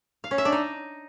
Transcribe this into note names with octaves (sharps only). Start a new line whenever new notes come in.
F5
C#4
E5
D4
D#4